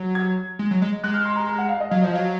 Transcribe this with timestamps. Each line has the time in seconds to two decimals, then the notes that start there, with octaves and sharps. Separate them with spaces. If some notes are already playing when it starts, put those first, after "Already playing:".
Already playing: F#3
0.15 G#6
0.59 G#3
0.71 F#3
0.82 G#3
1.03 G#3 F#6
1.14 F6
1.25 C6
1.36 A#5
1.47 A#5
1.58 F#5
1.69 F5
1.80 D#5
1.91 F#3 F5
2.02 F3 D#5
2.13 F#3 F5